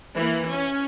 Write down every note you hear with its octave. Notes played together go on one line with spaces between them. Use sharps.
E3 A#3
C#4